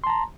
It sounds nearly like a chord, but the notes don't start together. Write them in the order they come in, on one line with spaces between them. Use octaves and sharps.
C6 A5 A#5